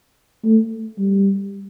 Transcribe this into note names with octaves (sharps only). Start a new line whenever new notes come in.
A3
G3